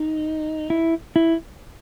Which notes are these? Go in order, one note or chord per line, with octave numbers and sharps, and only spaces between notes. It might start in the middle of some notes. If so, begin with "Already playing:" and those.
Already playing: D#4
E4
E4